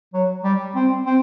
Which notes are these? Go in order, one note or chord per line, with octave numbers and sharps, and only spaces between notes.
F#3
G3
C4
C4